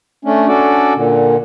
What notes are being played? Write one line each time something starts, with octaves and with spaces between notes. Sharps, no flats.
A3 C#4 D4
C#4 D4 F#4 A4 D5
A#2 D3